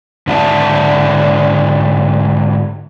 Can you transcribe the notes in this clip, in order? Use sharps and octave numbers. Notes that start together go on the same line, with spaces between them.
G#2 D3 E4 G4 D5 A5